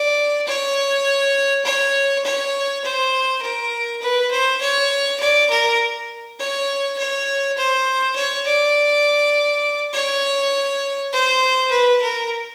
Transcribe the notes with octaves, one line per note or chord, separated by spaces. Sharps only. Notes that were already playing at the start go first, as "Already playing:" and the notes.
Already playing: D5
C#5
C#5
C#5
C5
A#4
B4
C5
C#5
D5
A#4
C#5
C#5
C5
C#5
D5
C#5
C5
B4
A#4